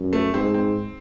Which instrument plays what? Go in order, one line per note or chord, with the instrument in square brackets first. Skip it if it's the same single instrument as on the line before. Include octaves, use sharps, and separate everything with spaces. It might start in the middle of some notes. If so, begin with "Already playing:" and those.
Already playing: [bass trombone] F#2
[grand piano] A3
[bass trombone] G#2 [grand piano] C4
[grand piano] C4